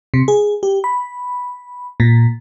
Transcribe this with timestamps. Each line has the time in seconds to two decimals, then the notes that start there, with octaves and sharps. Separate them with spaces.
0.14 C3
0.28 G#4
0.63 G4
0.84 B5
2.00 A#2